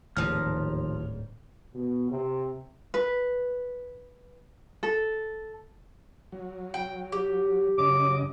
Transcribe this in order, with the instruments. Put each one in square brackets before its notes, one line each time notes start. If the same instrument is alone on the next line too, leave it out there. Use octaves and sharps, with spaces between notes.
[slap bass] D1 G#2 [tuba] D#2 [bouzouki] F3 A#5 [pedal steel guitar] F6
[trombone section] B2
C3
[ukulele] B4
A4
[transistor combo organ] F#3
[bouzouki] G5
G4
[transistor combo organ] F#2 C#3 D#5 [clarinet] D6